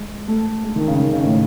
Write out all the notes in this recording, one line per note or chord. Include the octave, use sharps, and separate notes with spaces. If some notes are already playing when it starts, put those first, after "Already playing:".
Already playing: G#3
A3
G#3
D#3
C#3
D#3
C#3
A2